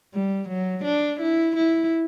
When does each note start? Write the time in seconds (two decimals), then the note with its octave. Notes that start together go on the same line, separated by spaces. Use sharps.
0.14 G3
0.48 F#3
0.84 D4
1.20 E4
1.56 E4